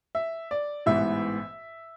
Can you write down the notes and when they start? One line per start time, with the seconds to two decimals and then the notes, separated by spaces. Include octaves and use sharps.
0.15 E5
0.51 D5
0.86 A1 G#2 E3 B3 E5